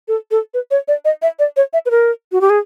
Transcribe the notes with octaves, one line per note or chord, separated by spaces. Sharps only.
A4
A4
B4
C#5
D5
D#5
E5
D5
C#5
E5
B4
A#4
F#4
G4
G#4